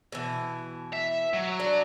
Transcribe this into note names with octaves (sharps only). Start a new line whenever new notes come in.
B2 E3
E5
F#3
D4